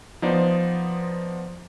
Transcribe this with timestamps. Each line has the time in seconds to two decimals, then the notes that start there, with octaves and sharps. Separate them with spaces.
0.22 F3 B3 D#4 C5 D5